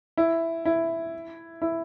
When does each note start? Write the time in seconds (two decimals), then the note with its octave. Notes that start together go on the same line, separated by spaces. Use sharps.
0.17 E4
0.65 E4
1.62 E4